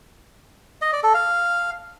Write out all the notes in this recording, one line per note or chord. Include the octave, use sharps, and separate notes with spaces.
D#5
D5
A4
F5